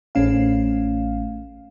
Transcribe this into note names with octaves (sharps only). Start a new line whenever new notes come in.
A1 A3 C#4 F5